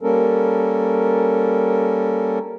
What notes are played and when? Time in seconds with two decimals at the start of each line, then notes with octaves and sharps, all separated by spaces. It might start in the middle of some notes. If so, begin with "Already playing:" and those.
0.01 G3 A#3 C#4 A4 A#4